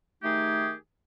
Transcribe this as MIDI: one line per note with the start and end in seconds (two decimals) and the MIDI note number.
0.23 0.73 51
0.23 0.73 57
0.23 0.73 63
0.23 0.73 67
0.23 0.73 68